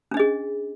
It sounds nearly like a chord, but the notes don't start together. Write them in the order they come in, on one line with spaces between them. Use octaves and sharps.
C#4 D4 D#5 G#4